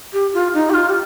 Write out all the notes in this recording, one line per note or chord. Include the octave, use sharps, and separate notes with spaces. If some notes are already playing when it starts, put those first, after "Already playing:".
G4
F4
D#4
G4
F4
G4